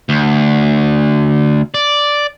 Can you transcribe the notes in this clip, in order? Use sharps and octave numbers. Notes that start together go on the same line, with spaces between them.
D2
D5